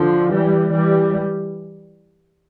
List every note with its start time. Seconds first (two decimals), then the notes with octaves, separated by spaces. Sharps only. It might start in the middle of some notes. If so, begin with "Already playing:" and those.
Already playing: D3 F3
0.33 E3 G3
0.73 E3 G3